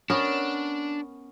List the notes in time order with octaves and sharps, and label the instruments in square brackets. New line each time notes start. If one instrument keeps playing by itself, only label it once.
[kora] B3 C#4 A#4 [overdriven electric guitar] D4